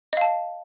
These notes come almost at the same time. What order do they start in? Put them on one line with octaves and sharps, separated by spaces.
D#5 F5 A5